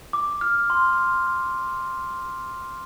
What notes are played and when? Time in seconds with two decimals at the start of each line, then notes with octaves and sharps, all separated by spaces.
0.13 D6
0.41 F6
0.70 C6
0.98 C6
1.27 F6